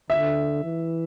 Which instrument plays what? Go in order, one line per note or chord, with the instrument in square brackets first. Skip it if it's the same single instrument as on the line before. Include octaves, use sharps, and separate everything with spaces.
[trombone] D3 [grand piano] E5
[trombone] E3